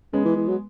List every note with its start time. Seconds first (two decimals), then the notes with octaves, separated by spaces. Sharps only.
0.13 C#3 G#3 B3
0.25 E3
0.37 E3
0.48 F#3